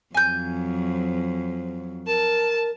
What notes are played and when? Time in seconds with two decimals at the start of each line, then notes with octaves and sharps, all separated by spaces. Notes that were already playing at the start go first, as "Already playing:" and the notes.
0.14 F2 F#3 G#5 G6
2.07 A#4 A5